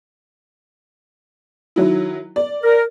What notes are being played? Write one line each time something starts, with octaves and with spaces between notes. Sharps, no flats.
D#3 F#3 E4
D5
A#4